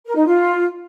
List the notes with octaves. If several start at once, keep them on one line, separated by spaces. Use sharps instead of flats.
A#4
D#4
F4